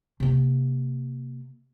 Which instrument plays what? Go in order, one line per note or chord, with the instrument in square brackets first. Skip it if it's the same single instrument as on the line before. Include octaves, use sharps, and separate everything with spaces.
[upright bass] C3 A#3